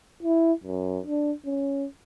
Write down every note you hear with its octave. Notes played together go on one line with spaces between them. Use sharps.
E4
F#2
D4
C#4